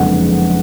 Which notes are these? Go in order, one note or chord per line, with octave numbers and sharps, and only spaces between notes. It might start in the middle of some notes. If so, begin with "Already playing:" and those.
Already playing: F#1 F2 D3 G#3 B3 F#5